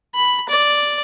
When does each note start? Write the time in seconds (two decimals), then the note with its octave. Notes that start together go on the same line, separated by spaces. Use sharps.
0.15 B5
0.49 D5